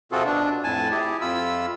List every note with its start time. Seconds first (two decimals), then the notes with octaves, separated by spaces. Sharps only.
0.12 C3 C4 F4 F#4 G#4 A4
0.25 B2 D4
0.64 F2 A2 G#5 A5
0.91 E4 G4 G#4
1.21 F2 F4 B5 E6